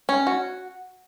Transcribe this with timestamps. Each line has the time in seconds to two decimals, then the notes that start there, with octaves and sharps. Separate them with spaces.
0.09 C#4
0.27 F#4